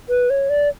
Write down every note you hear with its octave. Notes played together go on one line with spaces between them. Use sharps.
B4
C#5
D5